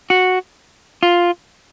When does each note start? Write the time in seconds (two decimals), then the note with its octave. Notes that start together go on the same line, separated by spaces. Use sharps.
0.10 F#4
1.03 F4